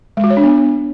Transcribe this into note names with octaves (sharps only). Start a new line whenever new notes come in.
G#3
F#4
C#5
D4
B3